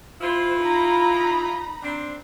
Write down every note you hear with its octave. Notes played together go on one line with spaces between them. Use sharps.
E4 F4 C5
D#4 A#5 B5
C4 D4